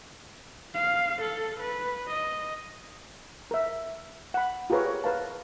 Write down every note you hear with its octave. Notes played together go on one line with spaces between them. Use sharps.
F5
A4
B4
D#5
A#4 E5
F#5 B5
F4 G4 G#4 A#4 B4 C#5
C#5
A#4 B4 F5 A5